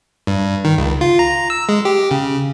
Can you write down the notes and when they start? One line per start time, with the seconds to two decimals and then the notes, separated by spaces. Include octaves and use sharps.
0.27 G2
0.65 D#3
0.78 C#2
1.01 F4
1.19 A#5
1.50 E6
1.69 G#3
1.85 G4
2.11 C#3